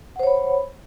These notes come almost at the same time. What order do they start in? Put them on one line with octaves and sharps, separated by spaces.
F#5 C5 C#5 B5